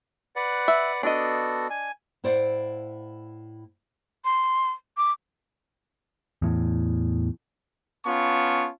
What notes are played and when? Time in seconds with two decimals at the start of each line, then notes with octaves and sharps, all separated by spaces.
0.36 B4 D5 F#5
0.68 E5
1.03 B3 D4 F#4 A4 D#5
1.70 G#5
2.24 A2 E4 C5 D5 F5 F#5
4.25 C6
4.97 D6
6.42 E2 A2
8.05 B3 C#4 F4 A5 C#6